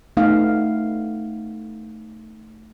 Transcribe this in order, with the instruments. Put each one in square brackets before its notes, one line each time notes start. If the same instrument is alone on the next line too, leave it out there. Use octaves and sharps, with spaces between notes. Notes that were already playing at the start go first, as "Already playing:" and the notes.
[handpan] A3 B3 D#4 F5